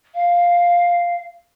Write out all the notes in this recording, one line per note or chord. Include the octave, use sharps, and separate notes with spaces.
F5